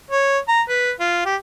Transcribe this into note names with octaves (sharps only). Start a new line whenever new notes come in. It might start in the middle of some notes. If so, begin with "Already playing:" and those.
C#5
A#5
B4
F4
G4